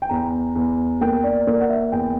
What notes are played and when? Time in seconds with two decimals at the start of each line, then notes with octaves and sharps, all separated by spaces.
0.02 G5
0.09 E2 A#5
0.55 E2
1.01 A#3 G5
1.24 D5
1.47 A#3 D5
1.60 F#5
1.69 E5
1.92 E2 G5